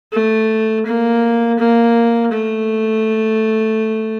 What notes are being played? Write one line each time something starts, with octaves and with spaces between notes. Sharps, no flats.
A3
A#3
A#3
A3